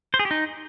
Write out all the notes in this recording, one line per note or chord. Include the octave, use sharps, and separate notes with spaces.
C5
G#4
G4
D#4